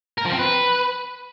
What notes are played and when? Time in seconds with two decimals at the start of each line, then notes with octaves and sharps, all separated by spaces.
0.18 A#4
0.25 F3
0.32 C4
0.39 B4